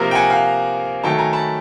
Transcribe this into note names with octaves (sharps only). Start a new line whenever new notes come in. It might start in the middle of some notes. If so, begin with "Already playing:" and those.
Already playing: C3 F3 A#3 A#4
G5
F#5 G#5
F5 G5
D#3 F#3 A3 G5 A5
G#5 A#5
A5 B5